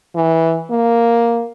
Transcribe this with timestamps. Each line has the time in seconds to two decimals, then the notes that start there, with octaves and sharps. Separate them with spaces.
0.15 E3
0.71 A#3